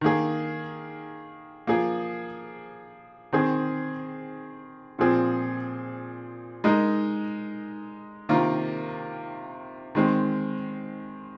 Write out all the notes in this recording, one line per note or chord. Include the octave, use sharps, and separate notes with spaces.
D#3 A#3 G#4
F3 A#3 G#4
D#3 C4 G#4
A#2 F3 C4 G#4
G#3 D#4 A#4
C3 D#3 A#3 F4 A#4
D#3 G#3 C4